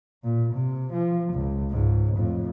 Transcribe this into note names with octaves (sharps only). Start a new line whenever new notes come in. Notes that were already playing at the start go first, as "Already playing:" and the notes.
A#2
C3
F3
C#2
C#2 G#2
F2 A2